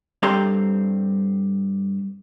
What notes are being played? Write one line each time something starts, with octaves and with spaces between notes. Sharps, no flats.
G2 C4 G4 A4 A#5 C6